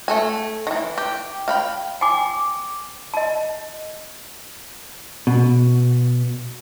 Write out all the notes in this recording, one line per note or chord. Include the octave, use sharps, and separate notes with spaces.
A3 A4 G#5
D#3 E3
G4
F5 G5 B5
G5 G#5 D6
D#5 A5
B2